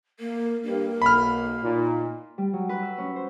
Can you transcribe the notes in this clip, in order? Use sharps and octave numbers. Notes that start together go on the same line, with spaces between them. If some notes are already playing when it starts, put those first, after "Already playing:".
A#3 A#4
G2 A#3
B1 B5 F6
A#2 D#4
G3
F#3
B4
E6
C#4
C5